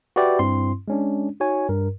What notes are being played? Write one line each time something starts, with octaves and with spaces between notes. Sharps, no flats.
F#4 G4 B4 D5 E5 G5
G2 C4 E4 C6
G#3 C#4 D4
D#4 F#4 C#5 G#5
G2 A#4